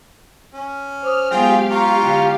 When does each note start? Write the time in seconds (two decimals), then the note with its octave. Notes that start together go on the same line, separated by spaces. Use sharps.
0.54 C#4
1.02 C5 D6 D#6 F6
1.31 F#3 G#3 B3 F4 G4 G#4 F5 G5
1.71 F4 A#5 C#6
2.02 D3 E4